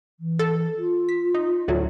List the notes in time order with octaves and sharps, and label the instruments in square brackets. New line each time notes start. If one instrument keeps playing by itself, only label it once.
[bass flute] E3
[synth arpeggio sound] A4
[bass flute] F4
[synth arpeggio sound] B6
D#4
D2 A2 F#3